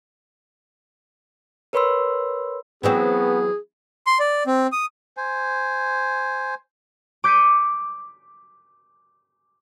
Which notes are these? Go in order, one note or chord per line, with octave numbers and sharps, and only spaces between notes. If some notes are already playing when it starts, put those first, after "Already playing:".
A#4 B4 C#5 B5 C6 E6
E3 F#3 B3 C4 G#4
C6
D5
C4
D#6
C5 G#5
D6 G6 B6 C#7 D#7